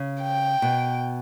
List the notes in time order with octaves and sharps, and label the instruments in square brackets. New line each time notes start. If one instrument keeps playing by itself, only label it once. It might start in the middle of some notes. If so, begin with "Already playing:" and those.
Already playing: [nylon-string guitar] C#3
[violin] G5
[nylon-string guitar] B2